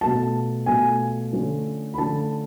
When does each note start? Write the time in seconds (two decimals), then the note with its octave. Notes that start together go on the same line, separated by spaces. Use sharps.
0.01 B2 A3 F4 A5
0.66 B2 A3 F4 G#5
1.33 D3 F3 A3 C#4
1.94 B5
1.98 D3 F3 A3 C#4 A5